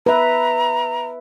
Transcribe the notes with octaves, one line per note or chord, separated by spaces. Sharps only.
B4 E5 A#5